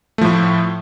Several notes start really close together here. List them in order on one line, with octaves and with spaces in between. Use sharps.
A3 F3 A2